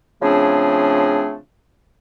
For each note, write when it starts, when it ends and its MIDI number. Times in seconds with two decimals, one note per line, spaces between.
0.22 1.36 49
0.22 1.36 53
0.22 1.36 57
0.22 1.36 60
0.22 1.36 62
0.22 1.36 68